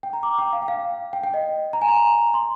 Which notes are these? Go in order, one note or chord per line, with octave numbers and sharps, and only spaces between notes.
G5
A#5
D6
G5
F5
G5
F5
G5
G5
D#5
A#5
G#5
A#5
C6